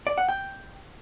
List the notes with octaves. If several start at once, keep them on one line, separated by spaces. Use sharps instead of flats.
D5
F#5
G5